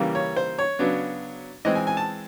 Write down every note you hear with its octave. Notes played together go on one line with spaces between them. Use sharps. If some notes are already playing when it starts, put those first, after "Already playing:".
Already playing: C#3 E3 G3 A#3
C#5
C5
C#5
C#3 F#3 B3 D4
E3 G#3 C4 D#5
G#5
G#5
A5